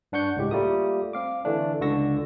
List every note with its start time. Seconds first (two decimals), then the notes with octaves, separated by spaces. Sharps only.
0.12 G2 D4 F#5 C#6 G6 C#7
0.36 C#2 A2 G#3 G4
0.51 G3 A3 A#3 F4 A#4 D#6
1.13 C4 F5 D6
1.45 D3 E3 A3 D4
1.81 C#2 D3 F#4 C#6 E6 A#6